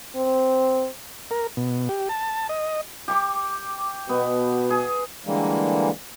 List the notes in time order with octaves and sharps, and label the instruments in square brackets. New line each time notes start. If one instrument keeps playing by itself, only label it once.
[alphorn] C4
[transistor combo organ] A#4
B2
G4
A5
D#5
[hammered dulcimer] G4 C#6 D6
[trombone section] B2 [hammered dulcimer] B3
[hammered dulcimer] G#4
[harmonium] D3 E3 G3 G#3 A#3